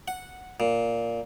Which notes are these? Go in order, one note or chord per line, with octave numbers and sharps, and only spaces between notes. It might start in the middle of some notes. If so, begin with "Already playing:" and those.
F#5
A#2